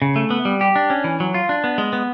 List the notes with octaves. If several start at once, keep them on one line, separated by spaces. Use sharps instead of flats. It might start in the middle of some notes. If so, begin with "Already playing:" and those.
C#3
A3
B3
G3
G4
D4
C#4
E3
F#3
F4
D4
B3
G#3
B3